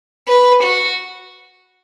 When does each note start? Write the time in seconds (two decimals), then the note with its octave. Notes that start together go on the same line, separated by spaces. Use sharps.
0.28 B4
0.63 F#4